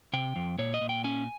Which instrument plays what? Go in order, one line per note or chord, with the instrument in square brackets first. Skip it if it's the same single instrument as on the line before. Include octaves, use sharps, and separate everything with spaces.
[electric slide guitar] C3 G5
F2
A#2 C#5
D#5
A#2
G5
C#4 G#5